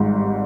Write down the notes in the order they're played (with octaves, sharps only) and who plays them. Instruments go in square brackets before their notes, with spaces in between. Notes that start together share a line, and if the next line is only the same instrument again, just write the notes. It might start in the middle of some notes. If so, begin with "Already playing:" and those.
Already playing: [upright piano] G#1 G#2 [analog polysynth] G3